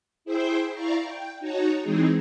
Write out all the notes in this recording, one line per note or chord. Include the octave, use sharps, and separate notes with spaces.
E4 G#4 C5 E5 G5 C6
E4 D5 F5 A#5 C#6
G5
D#4 F#4 C#5 A5 A#5
E3 G#3 C4 D#4 G#4